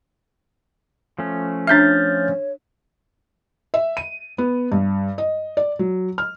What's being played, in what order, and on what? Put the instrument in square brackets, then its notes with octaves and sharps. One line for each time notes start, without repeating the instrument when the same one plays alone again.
[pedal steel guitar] F3 A3 C#4
[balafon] D4 E5 [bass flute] C#5 [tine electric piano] F6 G6 A6
[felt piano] E5
D#7
B3
G2
D#5
D5
F#3
F6